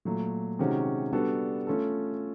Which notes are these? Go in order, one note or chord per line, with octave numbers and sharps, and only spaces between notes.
A#2 F#3 A3
C3 D#3 G#3 C#4 F#4
G3 B3 D4 F#4 A4
A3 C#4 F4 A4